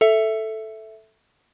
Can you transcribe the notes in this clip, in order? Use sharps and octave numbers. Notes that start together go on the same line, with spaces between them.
A4 E5